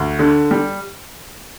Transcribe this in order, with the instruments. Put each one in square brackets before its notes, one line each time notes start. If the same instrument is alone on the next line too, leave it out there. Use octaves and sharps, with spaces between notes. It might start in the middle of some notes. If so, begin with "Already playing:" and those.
Already playing: [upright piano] D2
D3
G3